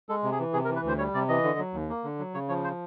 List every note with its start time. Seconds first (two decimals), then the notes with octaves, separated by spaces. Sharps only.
0.09 G#3 A4
0.23 C3
0.32 G#4
0.39 E3
0.53 C3 G#4
0.65 A#4
0.69 E3
0.76 B4
0.84 D2 C5
0.98 G3 C#5
1.14 C3 D5
1.29 E3 D#5
1.44 D3
1.58 F#3
1.74 D#2
1.89 A#3
2.04 D3
2.19 F#3
2.34 C#3 C#5
2.49 F3 C#5
2.64 C5